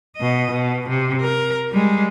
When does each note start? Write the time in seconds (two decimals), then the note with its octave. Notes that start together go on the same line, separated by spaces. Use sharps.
0.17 B2 D#5
0.52 B2
0.89 C3
1.21 A#4
1.71 G3 G#3